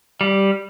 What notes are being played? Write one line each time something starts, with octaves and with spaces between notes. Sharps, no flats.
G3